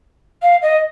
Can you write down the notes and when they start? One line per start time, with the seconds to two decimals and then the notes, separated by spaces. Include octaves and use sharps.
0.42 F5
0.62 D#5